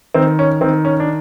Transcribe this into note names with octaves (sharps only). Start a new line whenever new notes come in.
D#3 C4
C#4
D#3 C4
C#4
D4